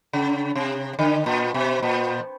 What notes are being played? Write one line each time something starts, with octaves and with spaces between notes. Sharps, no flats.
C#3
C3
D3
A#2
B2
A#2